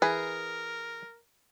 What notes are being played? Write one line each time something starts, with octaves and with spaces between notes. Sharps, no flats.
E3 G#4 A#4 B4